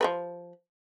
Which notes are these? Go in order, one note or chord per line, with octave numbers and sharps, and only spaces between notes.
F3 A#4 B4